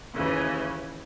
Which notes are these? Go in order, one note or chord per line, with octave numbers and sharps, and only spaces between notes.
D#2 C#3 E3